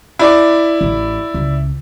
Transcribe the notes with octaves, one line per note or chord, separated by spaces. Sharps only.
E4 D5 D6
A1
C#2